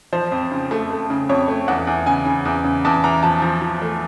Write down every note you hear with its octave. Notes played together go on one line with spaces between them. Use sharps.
F3 C5
F2
C#3
A3
A3
C#3
F2 C#5
A3
E2 F#5
E2
C#3 G#5
C#3
E2
C#3
E2 A5
E2 A#5
F3 A5
F3
F3
A3